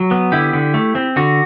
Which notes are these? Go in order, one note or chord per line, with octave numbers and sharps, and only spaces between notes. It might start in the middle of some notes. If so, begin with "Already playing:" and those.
Already playing: F#3
B3
D3 E4 G4
D3
A3
C4
D3 F#4